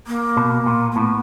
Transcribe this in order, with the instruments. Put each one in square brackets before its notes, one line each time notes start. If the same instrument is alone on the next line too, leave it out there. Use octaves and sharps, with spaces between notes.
[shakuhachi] A#3
[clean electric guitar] B2
A#2
[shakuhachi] A#3
[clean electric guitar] A2 [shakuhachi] B3